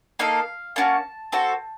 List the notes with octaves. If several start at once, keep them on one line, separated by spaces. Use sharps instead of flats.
A#3 D#4 A4 F5
A#3 C#4 F#4 A5
C4 F#4 A4